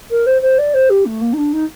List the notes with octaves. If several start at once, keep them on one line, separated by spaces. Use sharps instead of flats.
A#4
C5
C5
D5
C5
G4
A3
A#3
D#4
D4
D#4